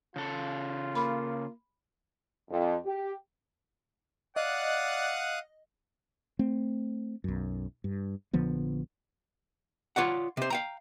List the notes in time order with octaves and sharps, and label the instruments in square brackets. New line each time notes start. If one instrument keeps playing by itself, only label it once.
[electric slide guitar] C#3 A4 [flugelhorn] F4
[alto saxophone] A#3 [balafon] B5
[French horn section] F2
G4
[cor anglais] D5 [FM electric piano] D#5 [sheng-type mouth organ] F5 D#6 F#6 [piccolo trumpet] F#5
[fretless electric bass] A3 C4
B1 F#2
G2
A#1 D3 F3 B3
[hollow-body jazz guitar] F4 C#5 D5 F#5
C3 C5
F5 G5 A#5